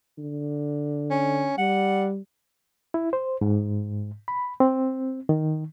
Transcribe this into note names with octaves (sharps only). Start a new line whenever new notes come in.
D3
C#4
G3 F#5
E4
C5
G#2
B5
C4
D#3